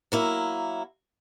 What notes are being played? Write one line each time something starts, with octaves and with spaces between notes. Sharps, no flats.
F#3 A#3 E4